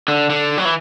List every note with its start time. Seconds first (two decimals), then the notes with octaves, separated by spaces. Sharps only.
0.08 D3
0.30 D3
0.57 F#3
0.65 E3